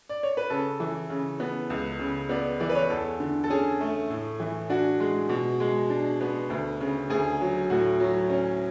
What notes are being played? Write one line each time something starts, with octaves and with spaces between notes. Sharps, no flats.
D5
C#5
B4
C#3 A4
E3
C#3
B3
C#2
C#3
B3 D5
E3 D5
B4
C#5
E2 A4
D3
A4
C#4 G#4
A3
A2
E3
D4 F#4
G#3
B2
G#3
D4
B3
D2
C#3
D2 G#4
F#3
A2 F#4
F#3
C#4